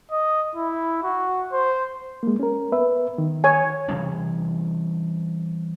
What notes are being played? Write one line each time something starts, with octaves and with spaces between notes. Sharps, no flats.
D#5
E4
F#4
C5
G#3 A#3
C#4 A#4
B3 B4 E5
D#3
C#5 G#5
C3 E3 G3 C#4